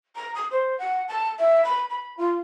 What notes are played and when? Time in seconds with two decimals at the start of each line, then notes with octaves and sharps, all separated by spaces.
0.16 A#5
0.35 D#6
0.51 C5
0.79 F#5
1.08 A5
1.39 E5
1.64 B5
1.90 B5
2.17 F4